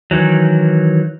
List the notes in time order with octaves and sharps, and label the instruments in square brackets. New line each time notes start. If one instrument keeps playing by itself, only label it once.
[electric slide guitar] D#3 E3 F#3